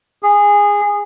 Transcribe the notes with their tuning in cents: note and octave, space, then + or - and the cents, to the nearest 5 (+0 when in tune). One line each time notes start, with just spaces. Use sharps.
G#4 -20